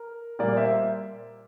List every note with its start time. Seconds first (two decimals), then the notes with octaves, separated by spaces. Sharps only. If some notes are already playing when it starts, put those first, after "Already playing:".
Already playing: A#4
0.39 A#2 G3 A#3 A#4 D5
0.56 C5 E5